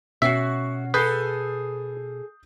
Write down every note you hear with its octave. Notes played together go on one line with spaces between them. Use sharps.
B2 C#4 F#4 E5 C7
G#4 A4 B4 D#6 G6 C7